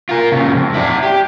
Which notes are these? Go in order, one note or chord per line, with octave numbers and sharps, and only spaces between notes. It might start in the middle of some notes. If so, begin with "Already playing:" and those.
F4 A#4
A#2 C#3
F2
E4 D5
G4